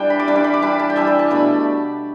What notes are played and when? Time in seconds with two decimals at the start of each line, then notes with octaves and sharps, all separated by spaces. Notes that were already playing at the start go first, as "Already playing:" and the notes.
Already playing: E3 G3 D4 G5
0.10 B5
0.20 D6
0.27 E3 G3 D4 B5
0.36 D6
0.44 B5
0.54 D6
0.62 E3 G3 D4 B5
0.79 A5
0.90 G5
0.96 E3 G3 D4 E5
1.07 B5
1.19 A5
1.30 B2 A3 D4 B5